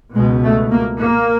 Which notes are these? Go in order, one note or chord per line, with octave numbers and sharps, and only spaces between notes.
C#2 B2 G#3
A3
A#3
A#3